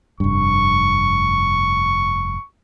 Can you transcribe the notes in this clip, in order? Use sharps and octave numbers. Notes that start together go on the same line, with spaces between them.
F1 G2 C#6